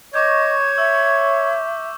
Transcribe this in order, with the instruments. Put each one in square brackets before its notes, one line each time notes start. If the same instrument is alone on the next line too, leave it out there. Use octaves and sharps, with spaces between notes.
[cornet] C#5 [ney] D#5 [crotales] C#6 D6 G6 [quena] G#6
[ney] E5 [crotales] E6